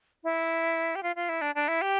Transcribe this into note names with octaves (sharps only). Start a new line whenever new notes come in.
E4
G4
F4
F4
E4
D4
D4
E4
G4